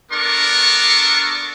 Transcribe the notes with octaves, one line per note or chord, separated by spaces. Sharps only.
B3 D4 A4 A#4 C#6 D6